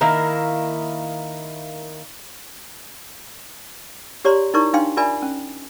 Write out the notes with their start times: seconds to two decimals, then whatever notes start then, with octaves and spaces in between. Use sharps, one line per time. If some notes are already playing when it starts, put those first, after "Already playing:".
0.01 D#3 A#3 E4 A#4
4.25 G4 C#5 D5 A#5 C6
4.54 D#4 E4 A#4 D5 A#5 C#6
4.73 D4 D#4 F5 G5 C6
4.97 F4 A#4 D5 E5 G#5 B5
5.22 C#4